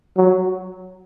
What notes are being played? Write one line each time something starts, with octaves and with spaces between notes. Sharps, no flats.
F#3